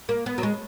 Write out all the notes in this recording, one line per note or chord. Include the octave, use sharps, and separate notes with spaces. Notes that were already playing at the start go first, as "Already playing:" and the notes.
A#3
B3
F#3
G#3